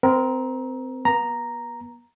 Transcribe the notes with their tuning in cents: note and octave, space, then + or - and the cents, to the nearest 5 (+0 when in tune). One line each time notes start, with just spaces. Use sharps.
C4 -20 A#4 +15
B3 -35 A#5 +0